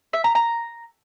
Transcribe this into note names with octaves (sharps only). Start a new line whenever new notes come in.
E5
A#5
A#5